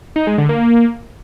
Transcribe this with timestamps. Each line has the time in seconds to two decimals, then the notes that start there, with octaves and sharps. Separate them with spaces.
0.16 D#4
0.27 G#3
0.38 D3
0.49 A#3